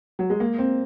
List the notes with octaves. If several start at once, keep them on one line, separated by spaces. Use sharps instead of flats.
F#3
G#3
A#3
C4